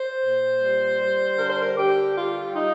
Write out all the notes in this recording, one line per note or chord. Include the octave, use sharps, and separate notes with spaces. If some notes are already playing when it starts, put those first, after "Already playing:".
Already playing: C5
A#2
G3
G3
D3 A#4
C5
A#4
D3 G4
G3 F4
G3 D#4